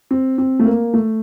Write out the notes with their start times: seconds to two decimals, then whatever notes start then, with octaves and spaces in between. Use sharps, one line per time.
0.11 C4
0.38 C4
0.59 A3
0.66 A#3
0.94 A3